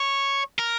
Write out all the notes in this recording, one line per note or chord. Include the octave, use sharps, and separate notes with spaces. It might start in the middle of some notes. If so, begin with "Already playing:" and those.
Already playing: C#5
A#4